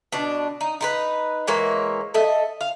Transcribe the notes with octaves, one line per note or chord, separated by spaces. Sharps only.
B2 D4
D#4
D#4 E4 B4
E3 G#3 A#3 C#5
A4 D#5 E5
F5